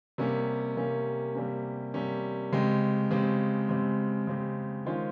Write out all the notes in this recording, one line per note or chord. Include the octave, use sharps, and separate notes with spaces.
C3 G3 A#3 C#4
C3 G3 A#3 C#4
C3 G3 A#3 C#4
C3 G3 A#3 C#4
C#3 G#3 C4 G4
C#3 G#3 C4 G4
C#3 G#3 C4 G4
C#3 G#3 C4 G4
D#3 G#3 C#4 F4 C5